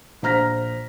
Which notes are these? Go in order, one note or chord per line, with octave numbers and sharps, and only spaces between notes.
A#1 C5 A#5 F6 A#6 B6